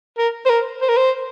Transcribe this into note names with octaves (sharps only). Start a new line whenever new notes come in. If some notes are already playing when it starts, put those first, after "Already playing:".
A#4
C5
A#4
C5
A#4
C5